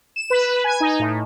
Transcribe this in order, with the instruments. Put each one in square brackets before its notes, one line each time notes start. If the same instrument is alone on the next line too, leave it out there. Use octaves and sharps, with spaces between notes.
[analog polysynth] E7
B4
G#5
D#4
A2